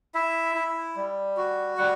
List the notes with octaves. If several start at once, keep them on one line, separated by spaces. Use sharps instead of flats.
E4 E5
E4
G3
F#4
G3 F#5